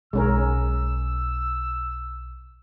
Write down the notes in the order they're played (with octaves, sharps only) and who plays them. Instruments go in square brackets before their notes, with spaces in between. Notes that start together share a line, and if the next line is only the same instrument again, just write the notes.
[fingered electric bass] B1 [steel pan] G#3 C#4 A#4 [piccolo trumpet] E6